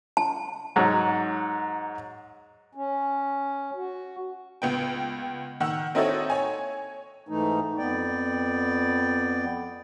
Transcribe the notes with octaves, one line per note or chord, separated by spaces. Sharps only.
A5
G#2 F#3
C#4
F#4
C#2 B3 G5
D#3 F#5 E6
C4 D#4 E4 F#4 A4 C#5
C#5 G#5
G#2 E3 A3 D#4
F2 B3 D5 G5